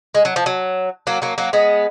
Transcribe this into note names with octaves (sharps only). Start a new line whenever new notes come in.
G#3
F#3
F3
F#3
F#3 A#3
F#3 A#3
F#3 A#3
G#3 B3